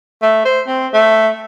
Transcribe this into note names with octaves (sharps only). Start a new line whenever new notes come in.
A3
C5
C4
A3